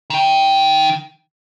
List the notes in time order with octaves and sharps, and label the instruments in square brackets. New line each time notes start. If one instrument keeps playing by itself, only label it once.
[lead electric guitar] D#3 G5